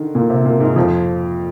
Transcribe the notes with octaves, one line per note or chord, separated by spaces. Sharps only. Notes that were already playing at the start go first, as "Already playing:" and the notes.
Already playing: D3 D#3
A#2 A#3
C3 C4
A#2 A#3
G#2 G#3
F2 F3